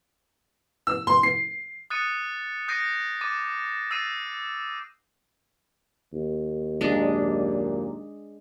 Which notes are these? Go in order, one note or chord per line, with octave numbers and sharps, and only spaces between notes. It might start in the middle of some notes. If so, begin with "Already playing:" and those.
E6
C6
C7
D#6 F#6 A6 C#7 D#7
D#6 G6 A#6 C7 D7 D#7
D6 A6 D#7 E7
E6 G6 A6 C7 D#7 E7
D#2
F#2 A#2 G#3 D4